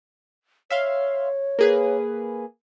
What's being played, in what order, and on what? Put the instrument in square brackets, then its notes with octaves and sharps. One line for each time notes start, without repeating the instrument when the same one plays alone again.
[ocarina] C#5 [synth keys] E5 F5 C6
[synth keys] A#3 G#4 B4